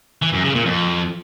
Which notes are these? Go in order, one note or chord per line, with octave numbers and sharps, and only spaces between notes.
E3
F#2
C#3
A#2
F2